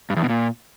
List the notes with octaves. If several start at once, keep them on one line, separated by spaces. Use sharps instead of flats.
G2
E2
B2
A#2